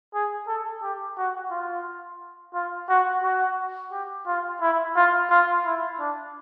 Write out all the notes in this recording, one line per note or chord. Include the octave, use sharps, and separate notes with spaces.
G#4
A4
G4
F#4
F4
F4
F#4
F#4
G4
F4
E4
F4
F4
E4
D4